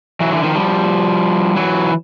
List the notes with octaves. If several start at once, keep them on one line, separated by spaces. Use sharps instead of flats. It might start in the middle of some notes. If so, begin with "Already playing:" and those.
E3 F#3
D3 E3
D#3 F3
F3 G3
E3 F#3